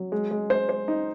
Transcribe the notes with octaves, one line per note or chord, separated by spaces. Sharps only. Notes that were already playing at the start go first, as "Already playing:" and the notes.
Already playing: F#3
G#3
G#3
C5
C5
D#4